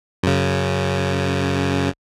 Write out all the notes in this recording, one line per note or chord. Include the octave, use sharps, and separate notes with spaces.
F#2 C#3